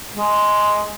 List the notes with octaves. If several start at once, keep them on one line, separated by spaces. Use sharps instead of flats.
G#3